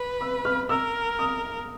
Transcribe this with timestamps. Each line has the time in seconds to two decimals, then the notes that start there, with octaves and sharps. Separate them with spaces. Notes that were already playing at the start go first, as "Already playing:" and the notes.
Already playing: B4
0.21 E6
0.45 F6
0.69 A#4 E6
1.19 D#6